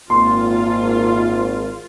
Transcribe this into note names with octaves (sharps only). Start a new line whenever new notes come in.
G#1 A#2 F4 C6